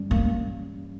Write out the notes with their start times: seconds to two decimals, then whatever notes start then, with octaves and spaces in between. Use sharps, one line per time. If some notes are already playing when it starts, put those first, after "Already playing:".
Already playing: G2 E3 G3 C#4
0.11 A#3